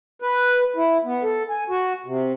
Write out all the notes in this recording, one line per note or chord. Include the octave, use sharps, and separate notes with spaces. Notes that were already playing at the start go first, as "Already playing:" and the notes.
B4
E4
B3
A4
G#5
F#4
C3